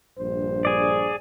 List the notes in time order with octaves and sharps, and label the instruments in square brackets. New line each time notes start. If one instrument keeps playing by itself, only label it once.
[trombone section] A#1 G2 C5
[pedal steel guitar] G#4 D5